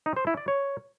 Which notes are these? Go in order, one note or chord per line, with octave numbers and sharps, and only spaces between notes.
D#4
C5
E4
D5
C#5